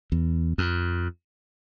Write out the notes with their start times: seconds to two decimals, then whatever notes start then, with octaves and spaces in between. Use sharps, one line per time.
0.12 E2
0.58 F2